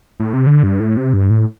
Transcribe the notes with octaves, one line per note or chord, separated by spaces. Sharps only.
A2
C3
D3
G2
A2
C3
G2
A2